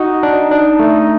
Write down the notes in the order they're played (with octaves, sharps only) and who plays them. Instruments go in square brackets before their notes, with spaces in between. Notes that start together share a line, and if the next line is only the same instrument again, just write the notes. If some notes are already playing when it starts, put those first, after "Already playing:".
Already playing: [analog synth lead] D#4 [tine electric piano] F#4
[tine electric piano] D4
D4
A3